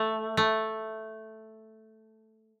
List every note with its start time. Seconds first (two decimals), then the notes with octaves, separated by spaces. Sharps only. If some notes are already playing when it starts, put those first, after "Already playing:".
Already playing: A3
0.37 A3